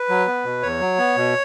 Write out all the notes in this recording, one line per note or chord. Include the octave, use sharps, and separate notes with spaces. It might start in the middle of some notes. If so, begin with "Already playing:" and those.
Already playing: B4
F#3
B3
B2
E2 C#5
F#3
B3
B2